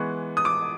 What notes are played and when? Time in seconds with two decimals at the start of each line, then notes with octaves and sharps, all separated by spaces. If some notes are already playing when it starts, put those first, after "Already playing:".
Already playing: E3 G#3 B3 C#6
0.37 D#6
0.45 D6